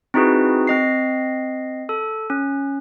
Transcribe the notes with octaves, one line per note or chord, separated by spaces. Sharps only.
C4 D#4 E4 F#4 G#4 B4
C4 D#5 C7
A4
C#4